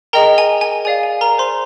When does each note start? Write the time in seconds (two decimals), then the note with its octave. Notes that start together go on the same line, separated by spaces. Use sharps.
0.13 G#4 A#4 D#5 G5 A#5
0.38 G#5
0.61 G#5
0.85 G#4 D5 F5 G#5
1.03 G#5
1.21 A#4 A#5
1.38 C5 C6